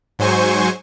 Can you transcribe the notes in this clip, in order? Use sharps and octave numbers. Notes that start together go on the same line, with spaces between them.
G#2 F#3 C5 G#5 C#6